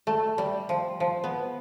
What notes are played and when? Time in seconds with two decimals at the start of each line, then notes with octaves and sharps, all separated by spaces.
0.07 A3
0.38 G3
0.69 F3
1.00 F3
1.24 B3